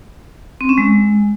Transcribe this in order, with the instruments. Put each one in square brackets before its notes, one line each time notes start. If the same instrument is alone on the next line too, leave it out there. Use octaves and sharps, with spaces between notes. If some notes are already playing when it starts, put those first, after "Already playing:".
[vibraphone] C4
C#4
G#3